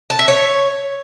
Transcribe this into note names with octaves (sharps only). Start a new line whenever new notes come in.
A5
E5
C#5